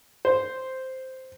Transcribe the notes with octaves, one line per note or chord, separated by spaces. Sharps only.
C5